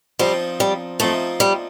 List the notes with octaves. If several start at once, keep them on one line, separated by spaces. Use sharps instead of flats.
F3 G3 C4 D#4
G3
F3 A3 C4 D#4
G3